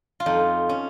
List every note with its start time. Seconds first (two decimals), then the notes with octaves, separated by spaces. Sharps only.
0.20 F4
0.26 F2 D#4
0.69 C#4